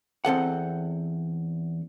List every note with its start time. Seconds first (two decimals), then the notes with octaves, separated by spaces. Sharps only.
0.25 E2 C4 A4 F#5